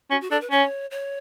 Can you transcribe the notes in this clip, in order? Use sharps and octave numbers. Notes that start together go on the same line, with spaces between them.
C#4 F#4
F#4
D4 A4
B4
C#4 C#5
C#5